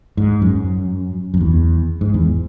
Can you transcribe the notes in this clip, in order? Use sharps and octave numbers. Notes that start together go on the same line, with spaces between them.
G#2
F#2
F#2
E2
G#2
E2